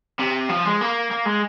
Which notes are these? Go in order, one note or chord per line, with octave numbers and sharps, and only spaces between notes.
C3
F3
G#3
A#3
A#3
G#3